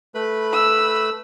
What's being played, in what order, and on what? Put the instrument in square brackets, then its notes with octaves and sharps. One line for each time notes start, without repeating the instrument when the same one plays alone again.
[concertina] A3 B4 B5
[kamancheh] E6